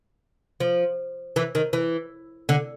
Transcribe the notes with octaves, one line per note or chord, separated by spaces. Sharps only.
F3
E3
D#3
E3
D3